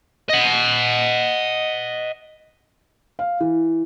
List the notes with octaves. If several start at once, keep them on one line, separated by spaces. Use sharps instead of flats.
D#5 F#5
F5
E3